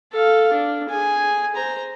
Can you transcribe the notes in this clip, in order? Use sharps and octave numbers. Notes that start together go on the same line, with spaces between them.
A4 F5
D4
G#4 G#5
C5 A#5